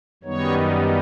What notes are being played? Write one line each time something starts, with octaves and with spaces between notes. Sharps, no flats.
F#2 D#3 G3 B3 D#4 C#5